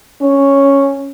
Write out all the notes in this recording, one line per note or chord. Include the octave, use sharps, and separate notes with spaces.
C#4